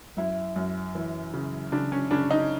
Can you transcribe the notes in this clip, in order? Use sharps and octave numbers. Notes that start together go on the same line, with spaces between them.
F#2 E4
F#2
E3
C#3
C#3 D4
C#4
C#3 D4
D#4